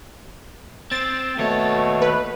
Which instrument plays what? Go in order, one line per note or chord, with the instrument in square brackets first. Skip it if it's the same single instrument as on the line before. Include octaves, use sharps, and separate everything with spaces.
[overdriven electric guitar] C4 [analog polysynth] A6
[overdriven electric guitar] D#2 C#5 [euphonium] B2 [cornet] A3
[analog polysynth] B4